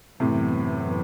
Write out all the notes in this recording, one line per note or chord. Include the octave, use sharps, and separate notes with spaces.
F#2 A2 C3 E3 B3